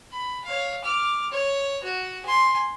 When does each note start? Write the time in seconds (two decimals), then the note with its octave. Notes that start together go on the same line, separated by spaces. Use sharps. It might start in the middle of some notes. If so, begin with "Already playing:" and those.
0.12 B5
0.44 C#5 F5
0.84 D6 F6
1.32 C#5
1.83 F#4
2.25 G#5 C6